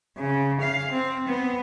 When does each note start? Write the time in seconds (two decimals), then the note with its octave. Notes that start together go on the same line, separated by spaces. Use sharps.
0.18 C#3
0.62 F5
0.92 C4
1.29 B3